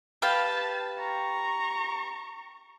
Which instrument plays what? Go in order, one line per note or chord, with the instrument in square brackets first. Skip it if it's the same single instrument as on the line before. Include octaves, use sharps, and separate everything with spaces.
[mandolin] G4 B4 F5 [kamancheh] A5
[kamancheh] A#5 C#6